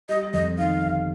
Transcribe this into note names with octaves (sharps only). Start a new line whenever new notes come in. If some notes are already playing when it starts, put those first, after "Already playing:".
G3 D#5
F2 D#5
D#3 F5
G1